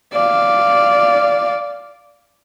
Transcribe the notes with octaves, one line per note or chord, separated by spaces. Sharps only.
D5 F5